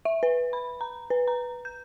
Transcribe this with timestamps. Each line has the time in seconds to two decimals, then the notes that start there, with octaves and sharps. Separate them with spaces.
0.05 E5
0.23 B4
0.53 B5
0.81 A#5
1.10 B4
1.28 A#5
1.65 G6